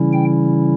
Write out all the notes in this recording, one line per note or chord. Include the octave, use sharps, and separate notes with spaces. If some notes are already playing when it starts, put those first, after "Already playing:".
Already playing: C#3 E3 G3 C#4 E4
G5